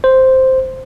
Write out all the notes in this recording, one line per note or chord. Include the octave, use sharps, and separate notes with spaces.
C5